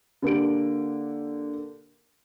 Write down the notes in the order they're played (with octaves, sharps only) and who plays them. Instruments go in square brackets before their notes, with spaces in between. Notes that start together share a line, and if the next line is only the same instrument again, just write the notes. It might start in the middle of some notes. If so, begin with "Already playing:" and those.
[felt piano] D3 A#3 G4 D7